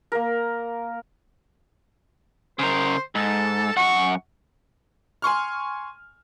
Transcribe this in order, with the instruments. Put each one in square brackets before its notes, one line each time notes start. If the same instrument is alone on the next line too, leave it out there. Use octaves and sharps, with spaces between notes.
[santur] A#3 A#4
[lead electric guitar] C#3 A#4 [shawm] C5
[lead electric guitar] G#2 [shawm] A4
[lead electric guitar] F#2 F#5 [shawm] C#6
[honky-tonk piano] G#5 C6 C#6 F6